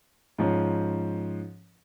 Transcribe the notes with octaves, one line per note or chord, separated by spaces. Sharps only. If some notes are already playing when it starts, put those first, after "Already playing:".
G#2 F3 C#4